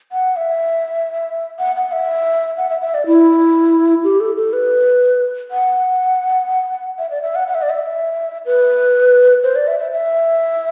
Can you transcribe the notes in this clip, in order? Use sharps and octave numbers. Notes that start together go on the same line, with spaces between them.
F#5
E5
F#5
F#5
E5
F#5
E5
E5
D5
E4
G4
A4
A4
B4
F#5
E5
D5
E5
F#5
F#5
E5
D5
E5
B4
C5
D5
E5
E5
E5